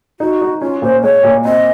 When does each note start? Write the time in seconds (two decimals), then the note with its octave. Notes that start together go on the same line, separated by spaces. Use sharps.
0.20 D#4 F#4
0.42 D#4
0.62 C#4 F4
0.82 A#2 C5
1.03 G#3 C#5
1.23 A#2
1.45 C4 D#5